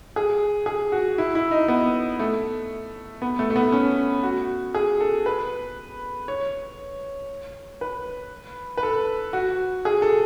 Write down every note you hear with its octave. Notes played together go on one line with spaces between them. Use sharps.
G#4
G#4
F#4
E4
E4
D#4
B3
A3
B3
A3
A3
B3
C#4
F#4
G#4
A4
B4
C#5
B4
B4
A4
F#4
G#4
A4